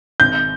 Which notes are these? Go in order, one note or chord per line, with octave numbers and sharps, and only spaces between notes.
G#1 G6